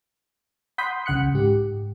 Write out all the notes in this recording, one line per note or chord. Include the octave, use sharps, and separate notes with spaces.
F#5 B5 C6 D#6 G6 B6
C2 C#3 F#5 F#6 C#7
G#2 G4